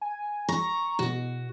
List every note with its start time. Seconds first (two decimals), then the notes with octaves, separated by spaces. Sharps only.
0.01 G#5
0.49 A#5 C#6
0.99 B2 F#4